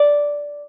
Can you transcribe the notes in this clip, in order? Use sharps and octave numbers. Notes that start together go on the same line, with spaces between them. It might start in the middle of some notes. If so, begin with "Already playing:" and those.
Already playing: D5